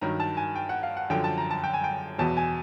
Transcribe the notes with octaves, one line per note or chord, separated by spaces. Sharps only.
G2 D#3 F#3 A#5
A5
G#5
G5
F#5
F5
F#5
F#2 D3 F3 G5
A5
A#5
A5
G5
G#5
G5
E2 B2 F#3 A5
G#5